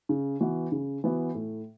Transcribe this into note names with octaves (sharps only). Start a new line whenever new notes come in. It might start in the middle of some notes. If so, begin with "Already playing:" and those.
C#3
E3 B3 F#4
C#3
E3 B3 F#4
A2